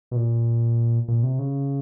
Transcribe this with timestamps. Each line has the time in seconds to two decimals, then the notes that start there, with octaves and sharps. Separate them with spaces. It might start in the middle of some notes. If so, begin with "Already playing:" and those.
0.11 B2
0.16 A#2
1.08 A#2
1.23 C3
1.39 C#3